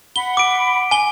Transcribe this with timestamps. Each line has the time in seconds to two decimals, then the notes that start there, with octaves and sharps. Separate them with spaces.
0.16 F#5 B5 G7
0.37 D6 D7
0.91 G#5 G7